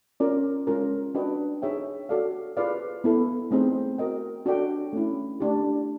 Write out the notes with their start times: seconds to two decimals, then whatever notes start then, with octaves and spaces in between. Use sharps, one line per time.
0.20 C#4 F4 A#4 D5
0.67 G#3 C#4 F4 A#4
1.15 D4 F#4 B4 D#5 G5
1.62 D#4 G#4 C#5 E5 G5
2.09 F#4 A4 D5 F5
2.57 F4 G#4 B4 D5 F5
3.04 B3 E4 A4
3.51 A3 C4 D#4 G#4 C5
3.98 F#4 A#4 D#5 G5
4.46 D4 F#4 A4 D5 G5
4.93 A3 C#4 E4
5.40 A3 D4 G4